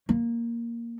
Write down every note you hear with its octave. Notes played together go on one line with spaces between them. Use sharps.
A#3